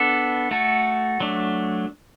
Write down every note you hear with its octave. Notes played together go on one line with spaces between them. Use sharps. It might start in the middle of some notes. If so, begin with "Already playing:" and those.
Already playing: B3 D4 A4
A3 F#4 A4
F#3 A3 D4